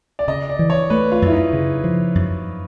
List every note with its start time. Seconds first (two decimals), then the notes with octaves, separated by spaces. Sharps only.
0.19 D5
0.28 C#3 D#5
0.49 D5
0.59 E3
0.70 C#5
0.90 A3 B4
1.12 F4
1.22 F#2 E4
1.32 D#4
1.53 C#3
1.84 F3
2.15 F#2